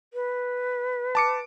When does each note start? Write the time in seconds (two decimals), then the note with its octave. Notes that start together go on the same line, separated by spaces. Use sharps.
0.13 B4
1.15 A5 D6 C#7